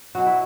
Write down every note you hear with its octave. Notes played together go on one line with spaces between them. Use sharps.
B2 F#3 F#4
E4